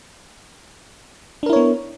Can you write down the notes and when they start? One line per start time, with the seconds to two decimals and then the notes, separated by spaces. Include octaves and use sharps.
1.43 D4
1.46 A#4
1.50 E4
1.53 C#5
1.56 B3